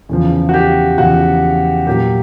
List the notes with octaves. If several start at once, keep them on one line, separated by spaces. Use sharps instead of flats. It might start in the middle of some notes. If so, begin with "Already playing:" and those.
E2 C#3 F3
F#4
G4
E2 C#3 F3 F#4
A#2 F#3 A#3 G4